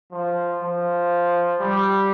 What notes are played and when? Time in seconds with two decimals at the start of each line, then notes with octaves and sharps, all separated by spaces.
0.12 F3
0.62 F3
1.61 G3